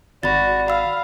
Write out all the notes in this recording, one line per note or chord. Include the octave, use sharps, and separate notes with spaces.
G#1 F#4 D5 B5 A6
F5 B5 E6